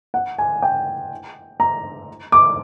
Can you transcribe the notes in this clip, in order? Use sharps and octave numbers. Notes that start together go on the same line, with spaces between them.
F#5
G#5
G5
A#5
D6